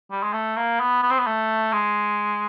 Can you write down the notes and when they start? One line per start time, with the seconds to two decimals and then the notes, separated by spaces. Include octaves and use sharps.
0.11 G3
0.23 G#3
0.33 A3
0.57 A#3
0.80 B3
1.03 B3
1.11 C4
1.19 B3
1.27 A3
1.73 G#3